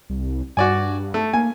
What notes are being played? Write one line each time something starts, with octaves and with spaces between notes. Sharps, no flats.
C2
G2 F#4 D5 G#5
A3
A#3 G#5